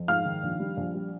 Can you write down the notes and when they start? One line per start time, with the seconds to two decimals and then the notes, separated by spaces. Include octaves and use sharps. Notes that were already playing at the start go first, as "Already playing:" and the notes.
Already playing: F2
0.08 G#2 F5 F6
0.25 D#3
0.43 A#1
0.60 G3
0.77 A#1
0.94 G3